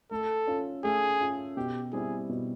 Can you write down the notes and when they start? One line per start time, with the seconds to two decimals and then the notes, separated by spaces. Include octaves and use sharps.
0.11 A3 A4
0.47 C#4 F4
0.84 A3 G#4
1.21 C#4 F4
1.57 B2 G4
1.93 G3 C4 E4 G#4
2.29 B2